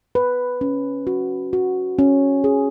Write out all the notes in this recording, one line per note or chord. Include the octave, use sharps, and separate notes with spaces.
B4
C#4
F#4
F#4
C#4
G#4